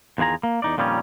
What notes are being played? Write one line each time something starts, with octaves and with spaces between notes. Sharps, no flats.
E2 D#3 F4 G#4 A#5
A#3
E2 D#4 D5
F2 A#2 D#3 G3 C4 C#4